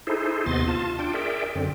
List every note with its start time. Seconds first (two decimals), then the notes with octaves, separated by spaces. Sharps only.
0.07 D#4 E4 G#4 A4 C5
0.46 D#2 C3 B3 D#5 C6 A6
0.68 F4 A5
0.99 D4 F4 G5
1.13 G#4 A#4 D5 E5 G5
1.55 F#2 D3 C4